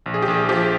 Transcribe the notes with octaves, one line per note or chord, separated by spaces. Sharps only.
A#1
G#4
G4
A#1 G#4
F3 G4